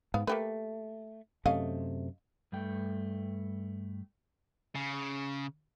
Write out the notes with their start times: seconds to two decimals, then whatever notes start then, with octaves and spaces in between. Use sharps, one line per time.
0.14 G#2 B3 F5
0.27 A3 A#3 G4 B4
1.46 F#2 C3 A3 C#4 D#5 F5
2.52 G2 G3 A3 G5
4.75 C#3